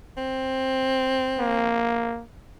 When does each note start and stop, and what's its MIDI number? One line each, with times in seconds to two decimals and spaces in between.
0.17 1.77 60
1.39 2.22 58